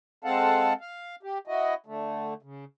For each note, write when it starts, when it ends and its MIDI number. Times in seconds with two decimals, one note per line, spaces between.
0.24 0.73 56
0.24 0.73 60
0.24 0.73 69
0.24 0.73 77
0.24 0.73 78
0.24 0.73 81
0.81 1.15 77
1.23 1.38 67
1.47 1.74 64
1.47 1.74 66
1.47 1.74 75
1.86 2.34 50
1.86 2.34 57
2.42 2.65 49